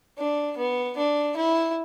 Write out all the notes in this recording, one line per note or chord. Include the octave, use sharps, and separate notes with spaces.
D4
B3
D4
E4